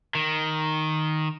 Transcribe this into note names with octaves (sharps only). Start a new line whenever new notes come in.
D#3